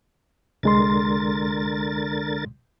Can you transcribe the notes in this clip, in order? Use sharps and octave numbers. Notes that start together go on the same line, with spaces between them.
C2 D3 G#3 A#4 C6 A6